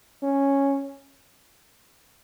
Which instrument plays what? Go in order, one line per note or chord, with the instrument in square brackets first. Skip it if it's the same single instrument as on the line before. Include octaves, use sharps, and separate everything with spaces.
[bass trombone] C#4